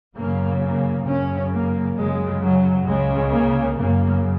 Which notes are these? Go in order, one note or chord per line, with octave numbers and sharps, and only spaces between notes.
F#2 C#3 A#3
A#3
F#2 C#3 C#4
A#3
F#2 C#3 G#3
F#3
C#2 C#3 G#3
A#3
F#2 C#3 A#3